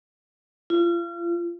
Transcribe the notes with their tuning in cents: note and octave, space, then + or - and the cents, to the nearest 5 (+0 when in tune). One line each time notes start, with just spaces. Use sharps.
F4 -35